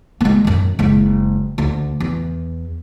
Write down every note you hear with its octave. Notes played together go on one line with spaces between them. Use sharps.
G#3 A#3
F#2 D#3
F#1 G#3
D2
E2